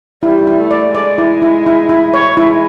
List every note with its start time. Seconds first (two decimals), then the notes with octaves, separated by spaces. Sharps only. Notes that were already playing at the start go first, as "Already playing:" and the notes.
0.23 G3 E4
0.47 E4
0.59 A3
0.71 D5
0.95 G#3 D5
1.18 E4
1.42 E4
1.66 E4
1.89 E4
2.14 C#5
2.37 G#3 E4